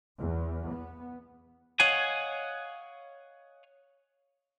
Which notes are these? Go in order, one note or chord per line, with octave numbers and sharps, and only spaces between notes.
E2
B3
C#5 D#5 F5 F#5 G#5